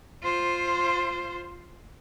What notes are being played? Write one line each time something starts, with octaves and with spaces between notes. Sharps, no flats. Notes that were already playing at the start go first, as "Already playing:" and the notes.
F4 C5